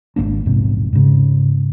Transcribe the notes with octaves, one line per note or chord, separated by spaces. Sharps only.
G#1 G2 A#3 D4
A#1 E2 G#2 C3
G#2 C#3